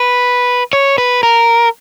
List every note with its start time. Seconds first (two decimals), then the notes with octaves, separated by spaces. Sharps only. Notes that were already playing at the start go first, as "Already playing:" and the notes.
Already playing: B4
0.73 C#5
0.98 B4
1.23 A#4